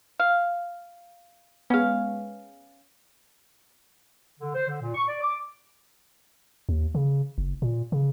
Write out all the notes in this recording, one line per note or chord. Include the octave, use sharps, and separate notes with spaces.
F5
G#3 B3 C#4 F5
D3
C5
D3
A#2
C#6
D5
D6
D#2
C#3
F#1
A#2
C#3